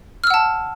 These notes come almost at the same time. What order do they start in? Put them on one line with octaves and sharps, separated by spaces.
F6 E6 F#5 A5